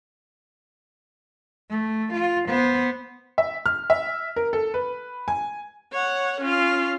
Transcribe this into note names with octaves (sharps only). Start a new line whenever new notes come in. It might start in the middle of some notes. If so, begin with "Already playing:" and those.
A3
F4
B3 C5
E5
F6
E5
A#4
A4
B4
G#5
C#5 F#5
C#4 F4